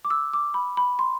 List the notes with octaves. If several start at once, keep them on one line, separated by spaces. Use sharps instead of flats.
D6
E6
D6
B5
B5
C6